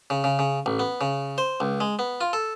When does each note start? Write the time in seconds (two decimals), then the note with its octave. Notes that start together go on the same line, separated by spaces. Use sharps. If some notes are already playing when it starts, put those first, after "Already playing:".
0.10 C#3
0.24 C#3
0.39 C#3
0.66 A1
0.79 B3
1.01 C#3
1.38 C5
1.60 C#2
1.80 G#3
1.99 B3
2.21 F4
2.33 A4